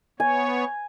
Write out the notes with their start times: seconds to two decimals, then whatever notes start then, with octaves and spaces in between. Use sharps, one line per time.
0.20 B3 C#5 G#5